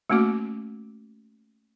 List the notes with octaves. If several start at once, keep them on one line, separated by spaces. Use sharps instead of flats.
A3 A#3 C#4 F#4 D6